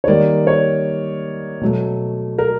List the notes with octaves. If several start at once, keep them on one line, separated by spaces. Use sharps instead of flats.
C#5
D#3 G3 A#3 D5
C#5
B2 F#3 A3
A#4